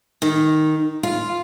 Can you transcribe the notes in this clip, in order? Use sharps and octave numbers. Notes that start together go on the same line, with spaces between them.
D#3
F4